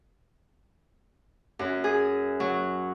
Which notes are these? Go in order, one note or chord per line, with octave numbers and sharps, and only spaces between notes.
F#2
G#4
F#3